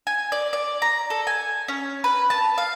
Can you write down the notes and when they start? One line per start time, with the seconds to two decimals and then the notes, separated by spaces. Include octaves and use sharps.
0.07 G#5
0.32 D5
0.53 D5
0.82 A#5
1.10 A4
1.27 G#5
1.68 C#4
2.04 B4
2.30 A5
2.58 F5